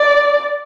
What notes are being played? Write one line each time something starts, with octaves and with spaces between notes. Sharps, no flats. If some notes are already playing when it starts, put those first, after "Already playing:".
Already playing: D5